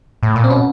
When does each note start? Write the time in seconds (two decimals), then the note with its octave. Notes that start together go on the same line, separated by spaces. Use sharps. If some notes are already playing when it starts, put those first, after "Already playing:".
0.23 A2
0.36 A#2
0.44 C4
0.50 B2 C#4